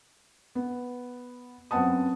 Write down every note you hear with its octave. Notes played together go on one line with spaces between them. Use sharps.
B3
F#2 B3 C4 F#5 A5 D#6